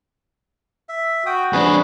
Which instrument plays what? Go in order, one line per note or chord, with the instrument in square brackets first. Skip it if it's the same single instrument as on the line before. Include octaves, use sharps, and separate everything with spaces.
[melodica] E5
[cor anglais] F#4 [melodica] G5 D#6
[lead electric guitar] F2 D4 [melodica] G#4 B4